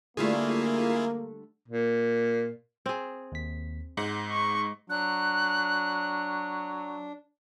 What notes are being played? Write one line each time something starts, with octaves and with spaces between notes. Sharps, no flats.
D3 G3 A3 A#3 E4 F4 G#4
A#2
C4 G#4
D#2 B6
G#2 G#3 F#5
C#6
F#3 D4 F#6